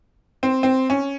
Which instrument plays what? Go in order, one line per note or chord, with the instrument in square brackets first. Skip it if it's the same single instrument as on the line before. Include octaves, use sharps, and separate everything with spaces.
[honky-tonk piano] C4
C4
C#4